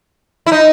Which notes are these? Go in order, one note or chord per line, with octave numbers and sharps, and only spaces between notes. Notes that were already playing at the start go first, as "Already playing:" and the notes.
E4
D#4